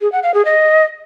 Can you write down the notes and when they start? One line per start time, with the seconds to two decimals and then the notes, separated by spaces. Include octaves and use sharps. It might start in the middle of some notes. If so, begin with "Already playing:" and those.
0.01 G#4
0.12 F#5
0.23 F5
0.34 G#4
0.45 D#5